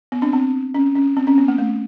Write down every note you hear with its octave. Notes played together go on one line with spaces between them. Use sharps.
B3
C4 D4
C4
C#4
C#4
C4
C#4
B3
A#3
A3